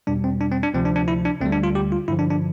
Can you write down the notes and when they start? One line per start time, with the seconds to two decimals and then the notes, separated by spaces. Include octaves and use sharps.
0.07 E2 B2 G3 D4
0.24 C4
0.40 D4
0.51 C4
0.63 D4
0.74 D2 C3 F3 C4
0.85 D4
0.96 D4
1.08 E4
1.25 D4
1.41 D2 D3 G3 C4
1.52 D4
1.63 F4
1.75 G4
1.92 F4
2.08 G2 D3 F3 E4
2.19 D4
2.31 D4